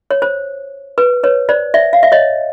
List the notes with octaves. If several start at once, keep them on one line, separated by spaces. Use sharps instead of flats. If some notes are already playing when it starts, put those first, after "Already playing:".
C#5
C5
B4
B4 C#5
C5 D5
D5 E5
F5
E5
C#5 D#5